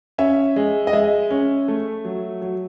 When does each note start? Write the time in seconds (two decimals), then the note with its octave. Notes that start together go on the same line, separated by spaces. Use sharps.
0.18 C#4 E5
0.56 G#3
0.87 D#5
0.93 G#3 E5
1.31 C#4
1.68 A3
2.05 F#3
2.42 F#3